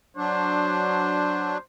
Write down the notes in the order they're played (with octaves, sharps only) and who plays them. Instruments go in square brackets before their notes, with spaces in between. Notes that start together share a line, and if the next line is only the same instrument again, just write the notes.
[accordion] F#3 D4 [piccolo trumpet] C5